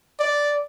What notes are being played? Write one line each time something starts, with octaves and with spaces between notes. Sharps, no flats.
D5